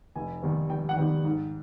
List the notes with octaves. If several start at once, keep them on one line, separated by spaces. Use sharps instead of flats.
F1 G#5
D#2 D#3 G3 B3
F1 G5
F#5
D#2 D#3 G3 B3 G5
G#2